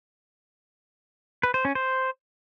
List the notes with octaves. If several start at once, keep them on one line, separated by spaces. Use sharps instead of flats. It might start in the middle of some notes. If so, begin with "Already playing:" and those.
B4
C5
C#4
C5